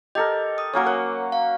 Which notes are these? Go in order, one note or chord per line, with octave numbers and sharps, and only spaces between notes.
G4 A4 A#4 D#5
D#6
F#3 A#3 C#4 C#5 D6
A#4 C#5 F#5
F5